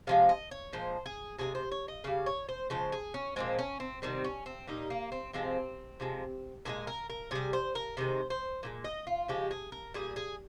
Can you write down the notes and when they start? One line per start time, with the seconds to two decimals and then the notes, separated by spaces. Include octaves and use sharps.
0.07 C3 F3 G#3 F5
0.29 D#5
0.51 C#5
0.73 A#2 F3 G#3 C5
1.06 G#4
1.39 C3 F3 G#3 G#4
1.55 C5
1.71 C#5
1.88 D#5
2.04 C#3 G3 F5
2.26 C#5
2.49 C5
2.70 C#3 F3 G#3 C5
2.92 G#4
3.14 C#4
3.36 A#2 F3 G#3 C4
3.58 C#4
3.80 C4
4.02 C3 D#3 G3 C4
4.24 C#4
4.46 C4
4.67 A#2 G3 D#4
4.90 A#3
5.12 C4
5.33 C3 F3 G#3 C4
6.00 C3 F3 G#3
6.65 A#2 F3 G#3 G#4
6.87 A#4
7.10 A#4
7.31 C3 G3 G#4
7.53 C5
7.75 A#4
7.97 C3 D#3 G#3 C5
8.30 C5
8.63 A#2 F3 G#3
8.84 D#5
9.07 F4
9.28 C#3 F3 G#3 G4
9.51 G#4
9.72 A#4
9.94 A#2 G3 G#4
10.16 G#4